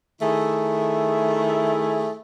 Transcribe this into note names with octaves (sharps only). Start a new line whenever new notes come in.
D#3 A3 E4 G#4